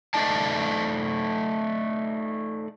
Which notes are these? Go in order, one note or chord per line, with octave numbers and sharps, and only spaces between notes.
A3 D#4 D5 A5